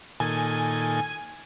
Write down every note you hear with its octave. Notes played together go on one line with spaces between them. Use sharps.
A#2 D#3 A4 G#5